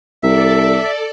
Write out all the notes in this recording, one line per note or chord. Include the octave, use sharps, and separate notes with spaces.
C2 A4 D5 E5